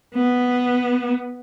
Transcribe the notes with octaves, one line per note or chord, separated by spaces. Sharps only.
B3